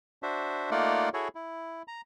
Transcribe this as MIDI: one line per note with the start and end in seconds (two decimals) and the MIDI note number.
0.23 0.70 62
0.23 0.70 66
0.23 0.70 72
0.23 0.70 76
0.71 1.09 57
0.71 1.09 58
0.71 1.09 63
0.71 1.09 65
0.71 1.09 74
0.71 1.09 78
1.14 1.28 64
1.14 1.28 66
1.14 1.28 68
1.14 1.28 69
1.14 1.28 73
1.35 1.82 64
1.88 2.01 82